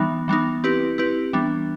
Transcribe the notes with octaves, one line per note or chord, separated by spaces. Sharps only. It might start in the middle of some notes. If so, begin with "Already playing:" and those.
Already playing: E3 G3 B3 D#4
E3 G3 B3 D#4
C4 E4 G4 B4
C4 E4 G4 B4
E3 G3 B3 D4